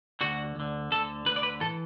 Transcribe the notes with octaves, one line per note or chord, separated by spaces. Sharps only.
D2 D3 F#4
D2 D3
D2 D3 A4
D2 D3 B4
D5
B4
A2 E3 A4